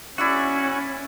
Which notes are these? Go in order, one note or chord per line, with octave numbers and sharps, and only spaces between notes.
C#4 E4 F#4 D5 E5